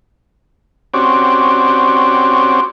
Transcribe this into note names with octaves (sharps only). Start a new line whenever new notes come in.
C4 C#4 F#4 G4 D5